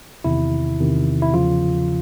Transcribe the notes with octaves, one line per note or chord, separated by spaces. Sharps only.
E2 C3 D#3 E4
E2 C3 D#3
E4
E2 C#3 F3 F4